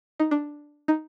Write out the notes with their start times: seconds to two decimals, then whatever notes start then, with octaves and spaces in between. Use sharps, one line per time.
0.20 D#4
0.31 D4
0.88 D#4